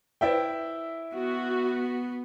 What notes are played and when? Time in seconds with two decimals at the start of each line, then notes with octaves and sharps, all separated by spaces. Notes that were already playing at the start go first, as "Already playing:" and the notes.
0.21 E4 B4 C5 D5 E5 G5
1.15 B3 F#4